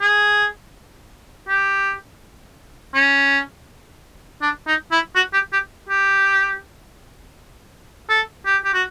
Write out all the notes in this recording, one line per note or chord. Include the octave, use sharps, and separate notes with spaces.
G#4
G4
C#4
D4
D#4
E4
F#4
G4
G4
G4
A4
G4
G4
F#4